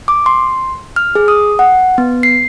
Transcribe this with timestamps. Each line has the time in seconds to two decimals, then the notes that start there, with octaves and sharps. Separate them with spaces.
0.08 D6
0.26 C6
0.96 F6
1.15 G#4
1.28 D#6
1.59 F#5
1.98 B3
2.23 C7